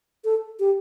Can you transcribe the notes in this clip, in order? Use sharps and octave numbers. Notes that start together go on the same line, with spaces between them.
A4
G4